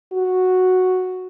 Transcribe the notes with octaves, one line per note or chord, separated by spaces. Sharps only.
F#4